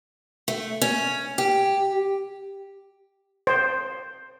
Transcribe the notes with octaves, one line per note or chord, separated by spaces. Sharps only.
A3
C#4
G4
C5